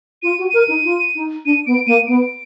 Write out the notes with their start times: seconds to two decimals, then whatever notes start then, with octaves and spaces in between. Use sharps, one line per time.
0.22 F4 D#7
0.39 F#4
0.49 A#4 D#7
0.68 D#4
0.84 F4
1.15 D#4
1.45 D4 D#7
1.66 B3 D7
1.86 A#3 D#7
2.07 B3 D7